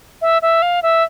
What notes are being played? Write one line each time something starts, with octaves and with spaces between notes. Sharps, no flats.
E5
E5
F5
E5